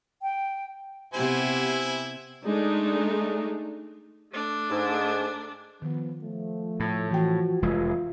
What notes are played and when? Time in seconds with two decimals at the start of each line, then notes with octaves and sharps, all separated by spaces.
0.22 G5
1.13 C3 B3 E4 G4 C5 G#5
2.45 G#3 A3 D4 D#4
4.32 A3 D4
4.70 G#2
5.82 D#3 F3 B3
6.22 F3 A3
6.80 A2
7.11 E3 F3 F#4 G5
7.62 F1 G#3 F4